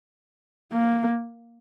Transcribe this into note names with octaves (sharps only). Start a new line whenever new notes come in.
A#3